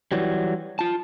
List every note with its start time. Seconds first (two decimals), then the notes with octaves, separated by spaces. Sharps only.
0.12 E3 F#3 G3
0.79 F4 A5